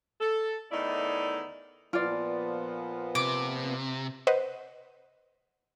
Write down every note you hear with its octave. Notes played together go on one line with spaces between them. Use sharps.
A4
E2 A2 D#3 D#4 E4 D5
A#2 F3 B3 F4 D5
C3 D6
B4 C5 D#5 F#5